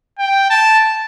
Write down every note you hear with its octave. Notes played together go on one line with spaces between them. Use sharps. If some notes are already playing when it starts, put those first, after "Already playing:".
G5
A5